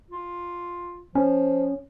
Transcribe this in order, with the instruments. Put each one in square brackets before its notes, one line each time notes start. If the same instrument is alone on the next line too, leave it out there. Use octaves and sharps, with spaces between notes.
[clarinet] F4
[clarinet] F3 [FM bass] C#4